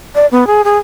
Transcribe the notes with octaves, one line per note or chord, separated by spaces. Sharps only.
D5
B3
G#4
G#4